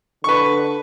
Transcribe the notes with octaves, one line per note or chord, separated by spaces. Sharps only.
D3 B4 C#6